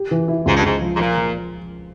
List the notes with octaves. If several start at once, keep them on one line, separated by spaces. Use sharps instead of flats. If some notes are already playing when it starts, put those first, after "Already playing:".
Already playing: G4
E3
E4
C#2 G#2
G2
C#2 G#2
F3
G#2
A#2 F3
F3